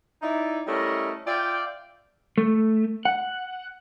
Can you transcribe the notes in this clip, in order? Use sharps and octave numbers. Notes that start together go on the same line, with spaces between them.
D#4 E4 D5
G3 A3 C#4 E4 A#4 D#5
F4 D5 E5 F5 G5
A3
F#5